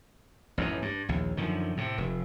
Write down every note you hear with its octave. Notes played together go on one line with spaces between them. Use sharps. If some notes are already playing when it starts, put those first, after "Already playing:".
A1 F#2 D3 E3
G2
A#1 D#2
F#2 D3 D#3 F3
A2 C3
F1